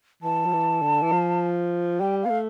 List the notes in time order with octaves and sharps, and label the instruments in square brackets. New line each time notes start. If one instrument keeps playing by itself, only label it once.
[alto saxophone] E3 [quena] A5
[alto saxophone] F3
E3
D3
E3
F3
[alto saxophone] G3 [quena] G5
[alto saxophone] B3 [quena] F5
[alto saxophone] A3